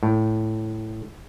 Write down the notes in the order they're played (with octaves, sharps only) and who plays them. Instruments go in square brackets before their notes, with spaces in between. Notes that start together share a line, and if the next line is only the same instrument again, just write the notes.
[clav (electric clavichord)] A2